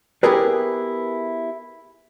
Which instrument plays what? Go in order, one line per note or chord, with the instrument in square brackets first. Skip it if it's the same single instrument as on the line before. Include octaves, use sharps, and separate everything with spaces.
[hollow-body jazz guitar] B3 E4 G4 G#4 A#4 B4